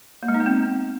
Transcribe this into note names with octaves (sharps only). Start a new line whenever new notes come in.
A#3
G#3
D#4
B3
C4